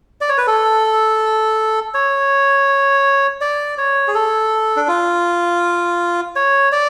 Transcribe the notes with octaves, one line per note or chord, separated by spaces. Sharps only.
D5
C#5
B4
A4
C#5
D5
C#5
G#4
A4
D4
F4
C#5
D5